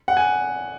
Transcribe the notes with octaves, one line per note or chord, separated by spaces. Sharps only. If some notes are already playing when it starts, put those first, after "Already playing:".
F#5
G#5